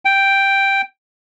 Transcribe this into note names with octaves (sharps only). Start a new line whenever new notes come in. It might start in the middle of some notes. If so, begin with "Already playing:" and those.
G5